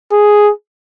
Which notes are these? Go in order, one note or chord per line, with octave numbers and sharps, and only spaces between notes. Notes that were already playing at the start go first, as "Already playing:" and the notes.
G#4